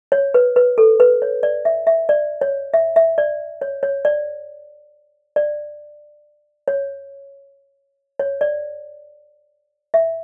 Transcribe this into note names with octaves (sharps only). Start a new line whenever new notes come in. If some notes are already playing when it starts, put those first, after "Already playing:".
C#5
B4
B4
A4
B4
C#5
D5
E5
E5
D5
C#5
E5
E5
D5
C#5
C#5
D5
D5
C#5
C#5
D5
E5